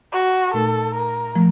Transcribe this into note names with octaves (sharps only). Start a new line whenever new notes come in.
F#4
A#2 A3 D#4 A4 A#4
A#4
F3 A3